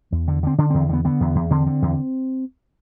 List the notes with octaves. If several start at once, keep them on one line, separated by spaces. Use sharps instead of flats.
E2
D3
D3 C4
D3 D4
E2 C4
D3 B3
D3 B3
E2
E2
D3 C4
D3
E2